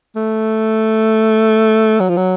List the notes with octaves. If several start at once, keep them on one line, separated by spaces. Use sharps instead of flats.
A3
F#3
F3
F#3